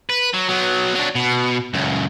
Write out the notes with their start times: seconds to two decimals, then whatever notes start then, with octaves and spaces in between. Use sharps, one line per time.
0.09 B4
0.34 F#3
0.49 F#3 B3
0.95 F#3 D4
1.15 B2
1.74 C#2 F#2